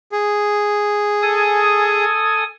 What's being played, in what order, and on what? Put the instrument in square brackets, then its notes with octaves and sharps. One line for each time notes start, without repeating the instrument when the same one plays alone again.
[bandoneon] G#4
[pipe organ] A4 G#5 D#6